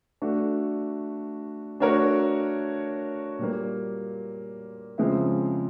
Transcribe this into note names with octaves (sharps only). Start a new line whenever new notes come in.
A3 D4 F#4
A3 D4 F#4 A#4 C#5
A#2 G3 A#3
C#3 F3 G#3 C4 E4